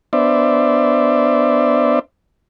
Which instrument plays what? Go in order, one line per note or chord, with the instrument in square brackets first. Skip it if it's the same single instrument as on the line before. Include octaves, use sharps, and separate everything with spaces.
[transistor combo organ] B3 D4 C5 D5 E5